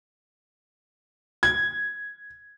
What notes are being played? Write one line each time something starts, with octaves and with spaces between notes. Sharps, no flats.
G#6